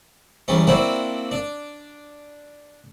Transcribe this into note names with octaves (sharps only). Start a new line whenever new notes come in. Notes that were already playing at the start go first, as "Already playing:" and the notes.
E2 F#3 G3 C#4
A#3 C4 D4 E4 F#4
D4